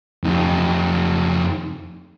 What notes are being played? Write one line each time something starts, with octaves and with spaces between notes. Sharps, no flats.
F2 D#4